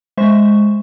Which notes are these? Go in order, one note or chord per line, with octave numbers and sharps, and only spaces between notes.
G#3 C5 E5 C#6